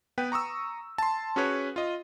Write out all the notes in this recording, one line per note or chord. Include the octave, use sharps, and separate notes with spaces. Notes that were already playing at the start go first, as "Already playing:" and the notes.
B3 B4 G5
A#5 C#6 D#6 E6
A5 C6
C#4 F#4 G#4 B4 C#5
F4 D#5